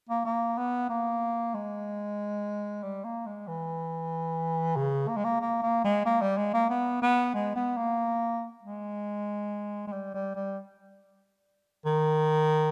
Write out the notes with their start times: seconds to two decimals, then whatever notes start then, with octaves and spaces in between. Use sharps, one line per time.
0.09 A#3
0.25 A#3
0.57 B3
0.89 A#3
1.54 G#3
2.83 G3
3.04 A#3
3.26 G#3
3.48 E3
4.76 C#3
5.08 A#3
5.16 G#3
5.24 A#3
5.41 A#3
5.62 A#3
5.84 G#3
6.05 A#3
6.21 G3
6.37 G#3
6.54 A#3
6.70 B3
7.02 B3
7.34 G#3
7.56 B3
7.77 A#3
8.63 G#3
9.87 G#3
9.92 G3
10.14 G3
10.35 G3
11.85 D#3